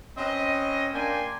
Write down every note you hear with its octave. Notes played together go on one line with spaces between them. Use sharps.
C4 C#4 B4 D#5
A#3 D4 D5 G5 G#5 C6